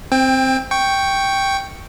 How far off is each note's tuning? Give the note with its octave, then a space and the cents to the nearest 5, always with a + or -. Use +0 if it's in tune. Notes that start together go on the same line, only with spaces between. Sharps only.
C4 +0 G5 +25
G5 +0 C#6 +0